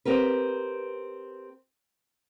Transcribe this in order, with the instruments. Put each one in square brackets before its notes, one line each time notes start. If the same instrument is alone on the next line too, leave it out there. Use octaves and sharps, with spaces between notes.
[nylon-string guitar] C4 G4 A#4 B4